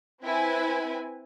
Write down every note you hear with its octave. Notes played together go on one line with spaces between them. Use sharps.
C4 E4 B4 G#5